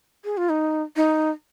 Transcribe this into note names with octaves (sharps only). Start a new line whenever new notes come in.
G#4
F4
D#4
D#4